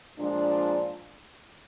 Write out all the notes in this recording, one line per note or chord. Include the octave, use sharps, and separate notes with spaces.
A#2 F3 G#3 D4